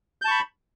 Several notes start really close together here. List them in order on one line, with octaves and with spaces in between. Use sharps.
G6 A5 C#6 B5